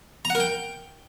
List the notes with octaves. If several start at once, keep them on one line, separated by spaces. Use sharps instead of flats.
A#5
F#5
A#4
G5